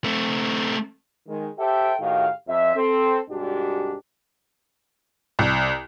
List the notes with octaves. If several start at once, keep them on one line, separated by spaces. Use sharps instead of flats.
A3 C4
D#3 G#3
G4 A4 C5 E5 G5
A2 D#3 F#4 G4 F5
F2 E5
C4 A4
C2 G#2 D4 F#4 G4
C2